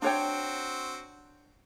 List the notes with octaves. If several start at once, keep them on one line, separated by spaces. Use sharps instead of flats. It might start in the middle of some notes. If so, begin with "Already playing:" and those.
C4 D4 F#4 C#5 G5